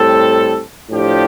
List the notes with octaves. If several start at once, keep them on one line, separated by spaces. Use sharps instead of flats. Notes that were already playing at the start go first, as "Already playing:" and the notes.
Already playing: A2 G3 C4 A4
A2 F3 D4 G4